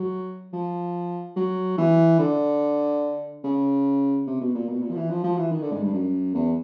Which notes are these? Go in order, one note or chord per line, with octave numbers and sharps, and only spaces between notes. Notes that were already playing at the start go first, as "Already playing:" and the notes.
Already playing: F#3
F3
F#3
E3
D3
C#3
C3
B2
A#2
B2
A#2
F3
E3
F3
F3
E3
D#3
D3
G#2
G2
F#2
E2